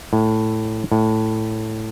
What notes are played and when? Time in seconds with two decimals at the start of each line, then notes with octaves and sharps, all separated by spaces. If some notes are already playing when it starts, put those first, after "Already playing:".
0.13 A2
0.92 A2